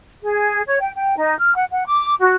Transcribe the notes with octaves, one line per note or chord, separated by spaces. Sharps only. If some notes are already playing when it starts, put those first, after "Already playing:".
G#4
C#5
G5
G5
D#4
F6
F#5
F#5
D6
F#4